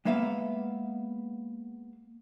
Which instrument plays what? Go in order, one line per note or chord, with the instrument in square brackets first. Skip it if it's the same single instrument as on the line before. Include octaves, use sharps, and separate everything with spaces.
[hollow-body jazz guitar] G#3 A#3 B3 E5 F5